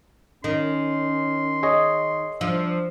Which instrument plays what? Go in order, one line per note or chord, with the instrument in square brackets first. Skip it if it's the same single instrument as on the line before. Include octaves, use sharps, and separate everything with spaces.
[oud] D#3 [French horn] C#4 [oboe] C6
[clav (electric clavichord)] G#4 C#5 D#5
[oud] F3 [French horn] D4 [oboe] E5